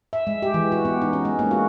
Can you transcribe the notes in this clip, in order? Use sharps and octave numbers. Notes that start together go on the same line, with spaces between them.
E5
G#3
G4
E3
F#4
B3
D#4
C#4
G#3
A#3
F#4